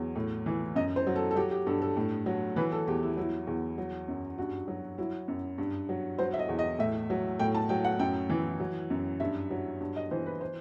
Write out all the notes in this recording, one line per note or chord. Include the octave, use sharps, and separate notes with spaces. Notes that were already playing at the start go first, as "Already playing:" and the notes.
Already playing: E2 F#3
A2
E3
F#2 D#5
C5
F#3
A4
A4
F#3 G4
G4
G2 A4
A4
A2
F#3
E3 B4
A4
E2 G4
E4
F#3 E4
E2
F#3
F#2
G2 F#4
F#3
F#3 E4
F#2
G2
F#3
F#3 C5
E5
D#5
E2
D#5
A2 E5
F#3
A2 G5
A5
F#3 G5
F#5
F#2 G5
E3
F#3
F#2
G2 E5
F#3
G2
D#5
E3 C5
B4
C5